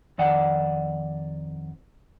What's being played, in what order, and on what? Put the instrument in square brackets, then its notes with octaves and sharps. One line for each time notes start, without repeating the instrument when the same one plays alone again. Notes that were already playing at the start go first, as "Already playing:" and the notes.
[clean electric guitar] F2 D#3 D5 F#5